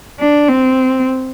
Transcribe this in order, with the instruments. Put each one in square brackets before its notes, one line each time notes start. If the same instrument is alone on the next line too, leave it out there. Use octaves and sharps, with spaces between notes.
[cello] D4
C4